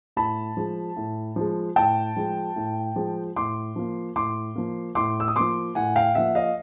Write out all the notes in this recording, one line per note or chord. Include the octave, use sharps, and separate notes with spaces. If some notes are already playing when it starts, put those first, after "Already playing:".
A2 A5 B5
F3 G#3
A2
F3 G#3
A2 G5 A5
F3 G#3
A2
F3 G#3
A2 C6 D6
F3 A#3
A2 C6 D6
F3 A#3
A2 C6 D6
E6
D#6
F3 A#3 C6 D6
A2 F#5 G#5
F5 G5
F3 A#3 E5 F#5
D#5 F5